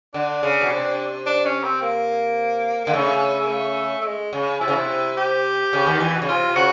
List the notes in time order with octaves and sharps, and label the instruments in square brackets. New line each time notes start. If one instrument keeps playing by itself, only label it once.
[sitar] D3 [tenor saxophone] D4
[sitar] C#3
B2
C3
[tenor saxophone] D4
C#4
C4
A#3
[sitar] D3 [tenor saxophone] A#3
[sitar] C#3 [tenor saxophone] A3
[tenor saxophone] A#3
A3
A3
G#3
[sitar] C#3
[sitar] C3 [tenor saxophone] E4
[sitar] C#3
C3
[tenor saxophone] G4
[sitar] C#3
D#2 D#3
E2 E3
B2
C#3
[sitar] C3 [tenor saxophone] F4
[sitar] C3
[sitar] C#3 [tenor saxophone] F#4